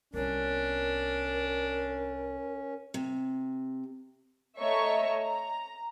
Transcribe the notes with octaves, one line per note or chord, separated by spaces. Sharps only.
C2 B3 C#4 D4 A#4
C3
A3 C#5 D#5 E5 A#5 C#6
A#5